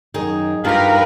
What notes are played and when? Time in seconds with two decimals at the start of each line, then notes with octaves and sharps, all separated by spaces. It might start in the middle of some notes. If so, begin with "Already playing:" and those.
0.14 F#2 D#3 D#4 G#4
0.65 G2 G3 D#4 F4 G4 A#4 B4 F5